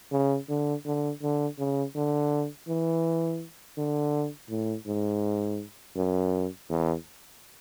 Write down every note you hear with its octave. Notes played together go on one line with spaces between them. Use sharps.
C#3
D3
D3
D3
C#3
D3
E3
D3
A2
G#2
F#2
E2